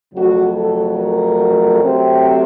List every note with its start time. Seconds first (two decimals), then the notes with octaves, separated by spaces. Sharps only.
0.14 F2 C#3 F#3 A3 F#4
0.56 A4
0.98 A#4
1.82 C3 F#3 A3 C4